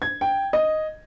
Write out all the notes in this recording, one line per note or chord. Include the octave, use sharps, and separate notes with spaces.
G#6
G5
D#5